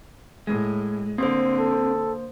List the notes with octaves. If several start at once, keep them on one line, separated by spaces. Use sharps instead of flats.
A2 G#3
D3 A#3 C4 C5
A4